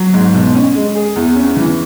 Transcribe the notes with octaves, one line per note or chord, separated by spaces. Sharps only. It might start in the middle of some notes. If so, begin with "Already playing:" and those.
Already playing: F#3
G#2
B2
C#4
G#3
G#4
E2
C#4
E3